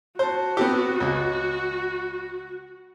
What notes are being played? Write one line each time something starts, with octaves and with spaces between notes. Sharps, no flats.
F#4 C5 A5
B3 C4 G4
C#2